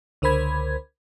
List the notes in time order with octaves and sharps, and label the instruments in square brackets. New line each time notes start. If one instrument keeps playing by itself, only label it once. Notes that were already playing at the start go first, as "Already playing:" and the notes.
[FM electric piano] C#2 D3 A#4 C5 B5 G#6